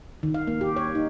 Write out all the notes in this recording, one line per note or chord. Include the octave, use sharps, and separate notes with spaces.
D#3
F5
A#3
G4
C#5
D#4